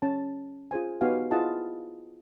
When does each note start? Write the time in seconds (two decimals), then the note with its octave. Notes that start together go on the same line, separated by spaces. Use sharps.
0.02 C#4 A5
0.71 F4 G#4 C5 G#5
1.01 B3 D#4 F#4 G4 F5 G#5
1.31 E4 F4 G#4 D#5 F#5 A5